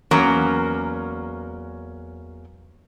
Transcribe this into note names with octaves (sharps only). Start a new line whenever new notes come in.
E2 F#3 A#3 C#4